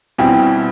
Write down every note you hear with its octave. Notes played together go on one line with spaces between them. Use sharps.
B2 G3 C4 E4 G5